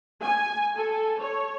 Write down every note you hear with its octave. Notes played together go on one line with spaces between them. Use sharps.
G#5
A4
C#5